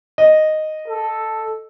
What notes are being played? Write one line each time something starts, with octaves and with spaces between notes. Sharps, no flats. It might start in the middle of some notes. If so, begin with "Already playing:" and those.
D#5
A4